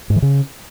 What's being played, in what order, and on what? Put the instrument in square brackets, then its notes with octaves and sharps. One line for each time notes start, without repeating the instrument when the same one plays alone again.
[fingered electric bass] G#2
E3
C#3